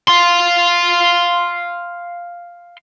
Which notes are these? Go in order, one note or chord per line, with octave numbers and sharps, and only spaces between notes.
F5 C6